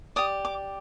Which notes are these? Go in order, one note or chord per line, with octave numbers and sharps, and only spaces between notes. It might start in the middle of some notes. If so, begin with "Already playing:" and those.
G4 D5 D#6
D6